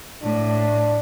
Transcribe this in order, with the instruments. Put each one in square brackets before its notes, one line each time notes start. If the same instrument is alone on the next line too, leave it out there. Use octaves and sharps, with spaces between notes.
[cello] A2 [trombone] D4